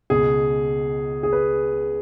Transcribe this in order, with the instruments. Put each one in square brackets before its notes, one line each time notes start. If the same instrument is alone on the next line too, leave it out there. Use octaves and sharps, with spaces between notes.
[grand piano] C#2 B2 G#4
G#4
B4